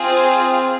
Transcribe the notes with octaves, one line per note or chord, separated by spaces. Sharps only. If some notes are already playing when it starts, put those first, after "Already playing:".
Already playing: C4 F4 G#4